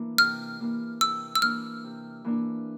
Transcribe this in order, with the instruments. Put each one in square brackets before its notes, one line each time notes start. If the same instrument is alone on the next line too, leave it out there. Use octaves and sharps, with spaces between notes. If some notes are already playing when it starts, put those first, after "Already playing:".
Already playing: [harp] E3 A#3 D4
[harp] C3 [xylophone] F6
[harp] E3 A#3 D4
[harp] C3 [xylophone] E6
[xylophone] E6
[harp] E3 A#3 D4 [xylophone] F6
[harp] C3
E3 A#3 D4